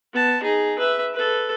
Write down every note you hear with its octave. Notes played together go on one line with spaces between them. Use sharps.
B3 A5
D#4 G#4
B4 E5
A4 B4